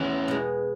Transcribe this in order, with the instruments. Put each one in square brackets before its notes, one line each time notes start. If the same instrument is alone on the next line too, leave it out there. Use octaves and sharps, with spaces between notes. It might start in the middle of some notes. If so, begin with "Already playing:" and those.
Already playing: [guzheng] E2 [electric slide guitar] C#4 E4
[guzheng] B2 G#3